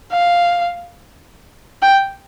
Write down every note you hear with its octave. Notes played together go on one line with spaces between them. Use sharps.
F5
G5